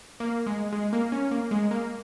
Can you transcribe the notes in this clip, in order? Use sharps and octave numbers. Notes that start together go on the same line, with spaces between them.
A#3
G#3
G#3
A#3
C#4
A#3
G#3
A#3